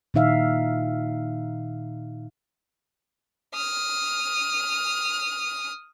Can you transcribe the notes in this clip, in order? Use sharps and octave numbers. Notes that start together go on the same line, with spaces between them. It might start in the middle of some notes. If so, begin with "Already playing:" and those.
A#2 D#3 D#4 E5 F5
D#6 F6